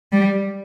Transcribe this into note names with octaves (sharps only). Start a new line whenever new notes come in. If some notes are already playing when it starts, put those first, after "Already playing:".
G3